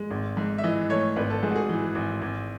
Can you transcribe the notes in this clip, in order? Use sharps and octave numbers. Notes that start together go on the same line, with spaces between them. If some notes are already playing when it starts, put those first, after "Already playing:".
Already playing: G#3
G#1
G#2
E5
E3 D#5
A3 C#5
G#1 B4
A4
G#2 G#4
F#4
G#4
E3
G#1
G#1